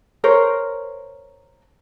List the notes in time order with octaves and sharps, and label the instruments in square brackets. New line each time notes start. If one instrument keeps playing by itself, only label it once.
[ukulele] A#4 C5 C#5